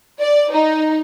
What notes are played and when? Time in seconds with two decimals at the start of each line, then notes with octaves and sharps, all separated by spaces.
0.20 D5
0.53 D#4